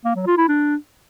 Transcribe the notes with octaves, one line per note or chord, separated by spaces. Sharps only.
A#3
F#3
F4
E4
D4